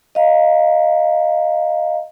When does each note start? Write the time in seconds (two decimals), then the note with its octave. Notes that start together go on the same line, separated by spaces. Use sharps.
0.15 D#5 F5 A#5